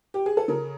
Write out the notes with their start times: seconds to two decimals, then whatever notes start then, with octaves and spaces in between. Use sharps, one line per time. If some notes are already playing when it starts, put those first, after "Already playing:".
0.14 G4
0.26 G#4
0.37 A4
0.48 C#3 A#4